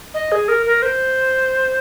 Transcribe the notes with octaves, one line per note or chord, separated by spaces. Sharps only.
D#5
G#4
A#4
A#4
C5